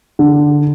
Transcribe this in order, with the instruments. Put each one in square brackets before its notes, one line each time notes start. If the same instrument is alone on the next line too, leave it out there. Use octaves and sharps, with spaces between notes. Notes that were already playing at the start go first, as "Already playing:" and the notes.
[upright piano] D3